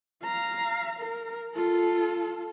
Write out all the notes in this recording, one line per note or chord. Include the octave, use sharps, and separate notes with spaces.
F5 A#5
A#4
F4 A4